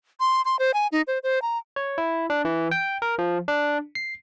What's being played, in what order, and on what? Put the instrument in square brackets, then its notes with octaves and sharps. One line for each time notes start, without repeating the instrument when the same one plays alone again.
[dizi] C6
C6
C5
G#5
D#4
C5
C5
A#5
[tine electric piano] C#5
E4
D4
E3
G5
A#4
F3
D4
C7